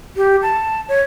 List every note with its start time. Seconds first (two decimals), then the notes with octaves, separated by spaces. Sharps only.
0.17 G4
0.42 A5
0.89 C#5